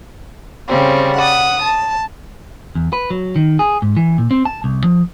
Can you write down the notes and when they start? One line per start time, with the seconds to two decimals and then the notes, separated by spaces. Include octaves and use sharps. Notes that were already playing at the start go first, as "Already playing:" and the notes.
0.67 C#3 G3 C4
1.16 F#5 D#6
1.61 A5
2.75 E2
2.93 B4
3.10 F#3
3.36 D#3
3.59 G#4
3.82 G#2
3.97 E3
4.18 A#2
4.31 C4
4.45 A5
4.64 C2
4.84 F3